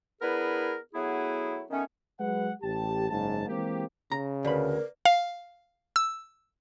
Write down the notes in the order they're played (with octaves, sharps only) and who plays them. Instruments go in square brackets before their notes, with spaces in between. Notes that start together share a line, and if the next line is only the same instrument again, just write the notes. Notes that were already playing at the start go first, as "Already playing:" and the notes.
[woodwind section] B3 D4 E4 G#4 A#4 B4
F#3 A3 B3 E4 G#4
D#3 A3 B3 C#4
[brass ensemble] F#3 G#3 B4 F#5
A1 G4 A5
F#1 G#2 A5
E3 G#3 A#3 C4 G4
[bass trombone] C#3 [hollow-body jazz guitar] A#5
[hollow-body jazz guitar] D2 B5 [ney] A#4 [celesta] B4 D5
[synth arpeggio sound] F5
E6